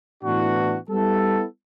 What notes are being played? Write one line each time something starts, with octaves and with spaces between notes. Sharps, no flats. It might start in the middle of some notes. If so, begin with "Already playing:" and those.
A2 E3 B3 D4 F#4
G3 B3 E4 A4